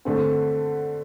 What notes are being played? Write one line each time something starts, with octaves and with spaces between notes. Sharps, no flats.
D3 A3 C4